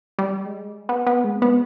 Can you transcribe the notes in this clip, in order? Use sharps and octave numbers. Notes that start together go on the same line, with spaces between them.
G3
G#3
B3
B3
G#3
B3